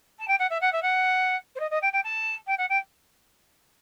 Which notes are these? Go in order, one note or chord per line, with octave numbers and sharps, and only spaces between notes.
A5
G5
F#5
E5
F#5
E5
F#5
C5
D#5
D#5
G5
G5
A5
G5
F#5
G5